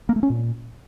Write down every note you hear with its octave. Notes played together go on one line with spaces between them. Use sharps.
A#3
A3
C#4
A#2